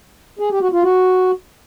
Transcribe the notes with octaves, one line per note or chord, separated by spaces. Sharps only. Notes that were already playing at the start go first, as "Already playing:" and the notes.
G#4
G4
F#4
F4
F#4